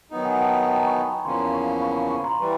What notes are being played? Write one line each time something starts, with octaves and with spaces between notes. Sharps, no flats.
D#3 F#3 B3 D#4
F#5 G#5
G5 A5
G5 A5
G#5 A#5
B5 C#6
B5 C#6
E2 C#3 F3 A#3 C#4 A#5 C6
B5 C#6
B5 C#6
B5 C#6
B5 C#6
A#5 C6
E3 G3